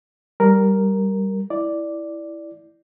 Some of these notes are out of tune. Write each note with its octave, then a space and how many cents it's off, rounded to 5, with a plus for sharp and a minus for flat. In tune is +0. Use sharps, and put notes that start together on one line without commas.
G3 -10 A#4 +0
E4 +0 D5 +0